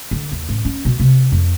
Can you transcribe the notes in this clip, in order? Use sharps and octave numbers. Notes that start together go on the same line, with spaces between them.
D3
D#2
A1
C#4
B2
C3
F2